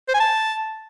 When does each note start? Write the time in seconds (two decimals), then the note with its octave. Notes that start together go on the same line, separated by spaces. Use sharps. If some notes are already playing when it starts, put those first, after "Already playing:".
0.09 C5
0.14 G#5
0.20 A5